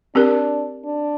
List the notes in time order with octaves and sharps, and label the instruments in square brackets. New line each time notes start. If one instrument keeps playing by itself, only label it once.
[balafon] C4 G4 A#4 [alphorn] D4
[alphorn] D4